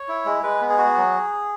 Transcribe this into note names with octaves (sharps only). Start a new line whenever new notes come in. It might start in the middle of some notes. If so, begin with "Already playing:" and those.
Already playing: C#5
E4
G#3
G#3 B4
B3
G#4
F#4
F#3